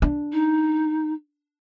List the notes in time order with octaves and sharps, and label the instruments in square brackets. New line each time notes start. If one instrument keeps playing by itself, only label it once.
[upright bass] D4
[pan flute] D#4